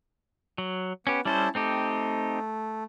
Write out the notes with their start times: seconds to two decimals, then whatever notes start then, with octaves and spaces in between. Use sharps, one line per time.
0.58 F#3
1.07 B3 C#4 G4
1.25 G3 C#4 E4 A4 C5 A5
1.55 A3 C4 D#4 G4